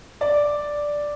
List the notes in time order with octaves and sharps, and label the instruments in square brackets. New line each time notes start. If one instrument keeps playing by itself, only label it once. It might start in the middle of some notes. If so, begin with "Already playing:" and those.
[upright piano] D5 D6